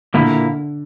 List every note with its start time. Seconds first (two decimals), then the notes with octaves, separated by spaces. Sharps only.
0.14 A#2 D3 A#3 E4